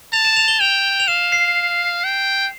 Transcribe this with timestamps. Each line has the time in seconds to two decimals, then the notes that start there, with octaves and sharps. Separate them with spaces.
0.13 A5 F7
0.25 E7
0.37 F7
0.48 G7
0.60 G5 F7
1.00 F7
1.08 F5 E7
1.32 C7
2.04 G5